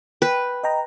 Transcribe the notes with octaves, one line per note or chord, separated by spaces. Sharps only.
B4 G5
D#5 G5 A#5